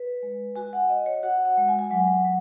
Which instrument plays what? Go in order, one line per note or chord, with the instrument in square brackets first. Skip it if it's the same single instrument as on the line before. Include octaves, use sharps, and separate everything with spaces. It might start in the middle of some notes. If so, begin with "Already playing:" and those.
Already playing: [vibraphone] B4
G#3
F#4 G#5
F#5
F#4 D#5
C#5
F#4 F#5
F#5
G#3
G#5
G#5
F#3 F#5
F#3